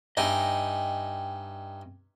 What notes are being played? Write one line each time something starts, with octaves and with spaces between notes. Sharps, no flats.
G2 D#4 E4 D#5 G5 G#5